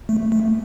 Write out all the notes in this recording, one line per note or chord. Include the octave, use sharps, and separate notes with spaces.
A3
A3